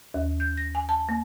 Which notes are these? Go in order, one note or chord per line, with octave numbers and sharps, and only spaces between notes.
D#2
G6
A#6
G#5
A5
A#3